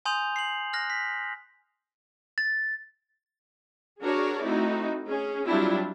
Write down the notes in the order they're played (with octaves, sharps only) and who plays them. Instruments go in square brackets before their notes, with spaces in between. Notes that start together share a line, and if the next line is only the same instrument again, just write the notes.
[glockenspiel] G#5 C6 D#6 G6 F7
C7 F#7
F6 F#6 A#6
B6
A6
[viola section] D4 F#4 G#4 A#4 C#5 D5
A3 C4 D#4 E4 F#4
C#4 G#4
F#3 G3 C4 D4 E4 F4